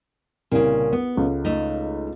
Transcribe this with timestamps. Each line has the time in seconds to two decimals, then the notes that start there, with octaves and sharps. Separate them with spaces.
0.51 C2 A#2 C#3
0.93 B3
1.15 C#2 A4
1.45 A3 D#4